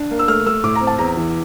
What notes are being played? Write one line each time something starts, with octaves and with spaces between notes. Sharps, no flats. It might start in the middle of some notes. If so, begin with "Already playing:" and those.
Already playing: D4
A#3
E6
A3 F6
A3 E6
A2 D6
A#5
C4
A5
E2 A#5
E3